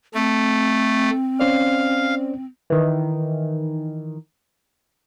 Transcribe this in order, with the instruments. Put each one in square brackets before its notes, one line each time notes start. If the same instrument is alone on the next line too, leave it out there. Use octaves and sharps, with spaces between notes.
[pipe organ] A3 [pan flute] C4
[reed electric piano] C#4 C5 D5 [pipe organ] F5
[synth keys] D#3 E3